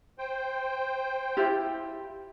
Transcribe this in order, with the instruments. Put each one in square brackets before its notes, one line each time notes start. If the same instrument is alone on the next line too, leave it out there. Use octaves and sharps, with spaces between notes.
[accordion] C5 G5
[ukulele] E4 F4 G4